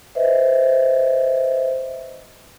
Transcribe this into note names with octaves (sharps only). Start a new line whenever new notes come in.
B4 C5 D#5 E5